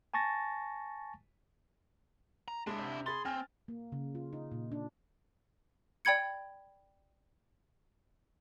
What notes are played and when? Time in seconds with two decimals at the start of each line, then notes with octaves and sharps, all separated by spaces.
0.14 G#5 A5 C#6 A6 A#6
2.48 A#5
2.67 G#3 D4 E4
2.79 C3
3.06 G#4 B5 C6 A6
3.25 C4 G#5 F6
3.68 A#3
3.92 C#3
4.15 F4
4.33 D#4
4.52 A#2
4.72 D4
6.05 D5 G5 B5 G#6 C#7